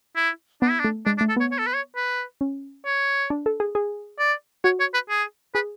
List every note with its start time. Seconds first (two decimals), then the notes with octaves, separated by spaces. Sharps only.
0.16 E4
0.62 B3 D4
0.71 E4
0.80 D4
0.84 A3
1.06 G#3 D4
1.18 D4
1.21 A3
1.29 A4
1.36 B3 C#5
1.52 C#5
1.59 A4
1.67 B4
1.74 C#5
1.96 B4
2.41 C#4
2.86 C#5
3.30 D4
3.46 A4
3.60 G#4
3.75 G#4
4.19 D5
4.64 F#4 C#5
4.80 C#5
4.94 B4
5.10 G#4
5.55 G#4 B4